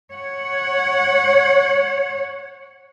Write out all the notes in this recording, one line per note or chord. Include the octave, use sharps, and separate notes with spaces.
C#5 F#5